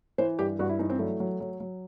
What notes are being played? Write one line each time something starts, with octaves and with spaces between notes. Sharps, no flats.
E3 C5
G2 G4
G2 F#4
E4
E3 D#4
C4
F#3 A3
F#3
F#3
F#3